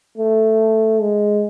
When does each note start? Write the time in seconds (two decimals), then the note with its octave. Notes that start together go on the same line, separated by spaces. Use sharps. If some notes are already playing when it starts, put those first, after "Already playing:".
0.17 A3
1.01 G#3